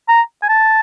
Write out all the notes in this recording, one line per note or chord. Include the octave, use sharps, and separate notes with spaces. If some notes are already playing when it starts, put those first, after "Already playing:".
A#5
G#5
A5